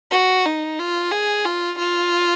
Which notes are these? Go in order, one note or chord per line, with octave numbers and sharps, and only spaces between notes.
F#4
D#4
F4
G#4
F4
F4